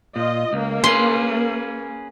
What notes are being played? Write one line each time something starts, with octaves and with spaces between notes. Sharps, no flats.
A#2 F4 D#5
C#2 A#3
C#4 G#4 B4 C6